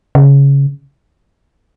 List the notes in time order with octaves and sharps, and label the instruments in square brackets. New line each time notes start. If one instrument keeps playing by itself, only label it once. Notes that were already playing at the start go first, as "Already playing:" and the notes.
[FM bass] C#3